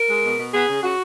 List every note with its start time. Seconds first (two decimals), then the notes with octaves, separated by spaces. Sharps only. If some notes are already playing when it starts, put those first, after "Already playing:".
Already playing: A#4
0.09 G#3
0.24 B2
0.38 B2
0.53 B3 G#4
0.69 C#3
0.82 C#3 F#4